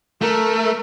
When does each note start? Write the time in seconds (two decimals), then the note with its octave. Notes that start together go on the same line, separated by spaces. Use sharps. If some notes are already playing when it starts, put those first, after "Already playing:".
0.22 A3 A#4